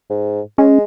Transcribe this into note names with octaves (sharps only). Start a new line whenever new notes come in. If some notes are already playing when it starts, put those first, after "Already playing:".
G#2
G#3 C#4